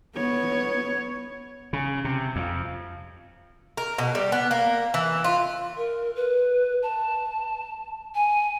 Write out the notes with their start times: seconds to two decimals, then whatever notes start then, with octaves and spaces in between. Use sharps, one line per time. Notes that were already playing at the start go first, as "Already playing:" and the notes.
0.15 B3 C#5
1.73 C#3
2.05 C3
2.36 F2
3.77 A#4
3.98 B2
4.15 G3
4.32 B3
4.51 A#3
4.94 E3
5.24 F4
5.77 A#4
6.16 B4
6.83 A5
8.15 G#5